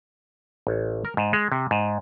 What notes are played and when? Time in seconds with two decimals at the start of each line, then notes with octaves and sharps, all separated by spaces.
0.67 A1
1.05 A#4
1.17 G#2
1.33 G#3
1.52 C3
1.71 G#2